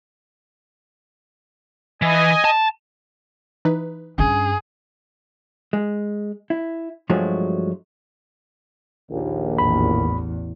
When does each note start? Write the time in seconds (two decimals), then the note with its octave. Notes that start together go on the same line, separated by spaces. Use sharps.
2.02 E3 D#5 G#5
2.44 A5
3.65 E3 D#4 B4
4.18 G2 C#4 G#4
5.73 G#3
6.50 E4
7.09 G2 F3 F#3 G#3 A3 F#4
9.10 A#1 D#2
9.58 A1 E2 B5